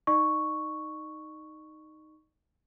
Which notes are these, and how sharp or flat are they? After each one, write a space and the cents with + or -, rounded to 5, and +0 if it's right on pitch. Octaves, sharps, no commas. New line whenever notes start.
D#4 +0 D5 +45 C#6 +0